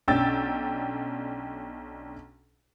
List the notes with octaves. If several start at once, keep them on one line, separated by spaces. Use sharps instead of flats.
B1 C#4 D4 G5 E6 A6